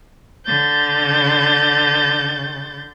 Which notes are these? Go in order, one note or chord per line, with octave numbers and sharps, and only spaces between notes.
D3 G6 A6